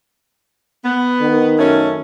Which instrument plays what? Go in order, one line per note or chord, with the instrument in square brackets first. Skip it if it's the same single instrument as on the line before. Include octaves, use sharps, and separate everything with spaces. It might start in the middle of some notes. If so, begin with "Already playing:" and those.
[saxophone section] B3
[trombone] D#3
[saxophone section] F#2 A3 C#4